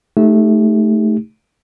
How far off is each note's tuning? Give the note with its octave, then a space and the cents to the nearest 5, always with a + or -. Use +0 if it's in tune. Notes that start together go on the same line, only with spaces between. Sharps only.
A3 -10 D#4 +0 G4 +10